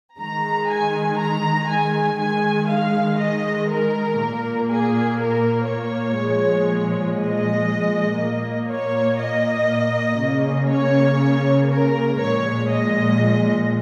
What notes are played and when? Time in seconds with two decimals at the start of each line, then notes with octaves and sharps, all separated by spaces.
0.19 D#3 G#3 A#5
0.69 G#5
1.19 A#5
1.69 G#5
2.19 D#3 G#3 G#5
2.69 F5
3.19 D#5
3.70 A#4
4.20 A#2 A#3
4.70 G#4
5.20 A#4
5.69 C#5
6.20 A#2 F3 G#3
7.19 D#5
8.20 A#2 A#3
8.70 C#5
9.20 D#5
10.20 C#3 A#3
10.70 C#5
11.71 A#4
12.21 A#2 F3 G#3 C#5
12.71 D#5